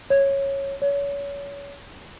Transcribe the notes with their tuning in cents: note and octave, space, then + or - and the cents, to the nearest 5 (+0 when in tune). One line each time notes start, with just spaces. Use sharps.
C#5 -10
C#5 +30